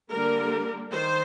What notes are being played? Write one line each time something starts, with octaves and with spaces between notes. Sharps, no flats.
D3 G3 A#3 D4 A#4
D#3 C5